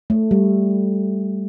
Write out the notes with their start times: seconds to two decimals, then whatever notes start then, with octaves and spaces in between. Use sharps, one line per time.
0.10 A3
0.31 G3